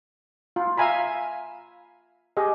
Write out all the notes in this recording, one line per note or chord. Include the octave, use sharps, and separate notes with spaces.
F4
E5 F5 G#5 A#5 B5
G4 G#4 D#5